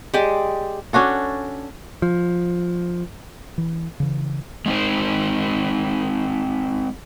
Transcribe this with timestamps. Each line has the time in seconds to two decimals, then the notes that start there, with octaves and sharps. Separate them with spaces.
0.14 G#3 G4 D5
0.93 C#4 D4 F#4 A4
2.02 F3
3.58 E3
4.00 C#3 E3
4.66 G#3 C4 D#4 C5